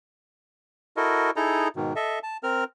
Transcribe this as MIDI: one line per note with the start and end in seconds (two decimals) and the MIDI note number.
0.97 1.31 64
0.97 1.31 66
0.97 1.31 69
0.97 1.31 70
0.97 1.31 75
1.36 1.68 63
1.36 1.68 64
1.36 1.68 68
1.36 1.68 69
1.36 1.68 75
1.36 1.68 82
1.76 1.93 44
1.76 1.93 47
1.76 1.93 51
1.96 2.19 69
1.96 2.19 75
1.96 2.19 76
2.23 2.37 81
2.43 2.64 60
2.43 2.64 70
2.43 2.64 89